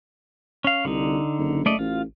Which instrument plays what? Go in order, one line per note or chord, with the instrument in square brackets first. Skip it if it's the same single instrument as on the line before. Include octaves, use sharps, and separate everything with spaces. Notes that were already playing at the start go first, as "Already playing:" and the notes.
[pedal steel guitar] C#4 F5
[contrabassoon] C2 [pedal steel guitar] D3 D#4
[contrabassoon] F#1
[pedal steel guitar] A3 D5 D#5
[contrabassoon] A1 [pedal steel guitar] F4